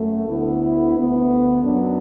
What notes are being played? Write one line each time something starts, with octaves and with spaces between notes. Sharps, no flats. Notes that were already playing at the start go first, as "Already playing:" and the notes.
Already playing: F#2 A3
D2 D3 B3 E4
D2 D3 B3
F#2 F#3 B3 D4